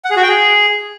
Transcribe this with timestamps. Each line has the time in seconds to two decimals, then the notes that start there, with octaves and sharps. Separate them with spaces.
0.04 F#5
0.11 G#4
0.17 F#4
0.23 G5
0.29 G#4